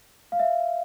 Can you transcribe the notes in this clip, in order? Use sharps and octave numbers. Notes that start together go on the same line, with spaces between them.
F5
E5